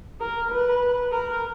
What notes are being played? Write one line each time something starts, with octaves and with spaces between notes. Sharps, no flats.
A#4
B4
A#4